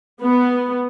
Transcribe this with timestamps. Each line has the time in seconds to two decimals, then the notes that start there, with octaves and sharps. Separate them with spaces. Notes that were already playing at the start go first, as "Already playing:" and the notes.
0.22 B3